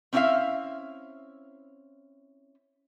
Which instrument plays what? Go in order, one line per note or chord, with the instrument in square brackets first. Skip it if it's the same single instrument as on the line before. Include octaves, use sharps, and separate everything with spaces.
[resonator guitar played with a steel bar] C4 C#4 E4 D5 E5 F5